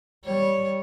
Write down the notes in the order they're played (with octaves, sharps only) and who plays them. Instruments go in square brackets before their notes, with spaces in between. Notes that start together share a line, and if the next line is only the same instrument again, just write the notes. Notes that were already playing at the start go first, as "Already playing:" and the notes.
[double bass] G3 [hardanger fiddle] C#5